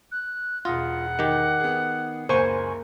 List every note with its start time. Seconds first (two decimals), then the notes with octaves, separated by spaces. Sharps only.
0.12 F#6
0.65 E1 F4 F#5 D#6 A#6
1.19 D#3 G4
1.60 B3 G#4
2.29 F#1 C#2 A#3 C5 G#5 C#6